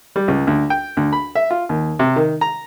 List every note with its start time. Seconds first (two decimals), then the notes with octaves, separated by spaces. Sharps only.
0.16 G3
0.28 C#2
0.47 D2
0.70 G5
0.97 D2
1.13 B5
1.35 E5
1.51 F4
1.69 D#2
1.99 C3
2.16 D#3
2.41 A#5